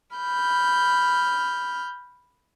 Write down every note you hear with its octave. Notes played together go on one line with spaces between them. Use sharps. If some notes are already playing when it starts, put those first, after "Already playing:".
B5 F6 G6